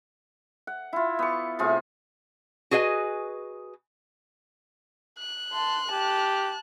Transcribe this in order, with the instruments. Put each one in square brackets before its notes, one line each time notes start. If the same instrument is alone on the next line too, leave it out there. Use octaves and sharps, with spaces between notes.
[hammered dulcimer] F#5
E4 F4
B3 C#6
A2 C3 F4 G#4
[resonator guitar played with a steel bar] F#4 G#4 B4 D#5 F#5 G#5
[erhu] F#6
[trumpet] A5 [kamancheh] C6
[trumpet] G4 [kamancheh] A5